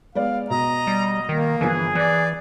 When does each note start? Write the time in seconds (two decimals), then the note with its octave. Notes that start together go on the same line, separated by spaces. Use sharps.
0.15 G#3 B3 D5 F5
0.50 B2 D#5 A#5
0.87 G3
1.29 D#3 A#3
1.61 G1 E3 F3 G#4 G#5
1.95 E3 D5 F#6